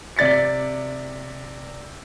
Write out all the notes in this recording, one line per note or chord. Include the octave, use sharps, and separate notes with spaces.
C3 D5 A6 B6 C#7